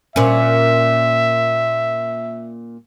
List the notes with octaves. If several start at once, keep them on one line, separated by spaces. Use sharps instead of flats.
A#2 C#4 E5